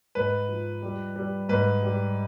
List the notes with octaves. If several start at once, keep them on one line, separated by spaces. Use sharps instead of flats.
G#2 B4
F3
G3
G3
G#2 B4
G3